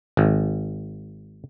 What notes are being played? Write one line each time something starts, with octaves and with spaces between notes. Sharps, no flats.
G#1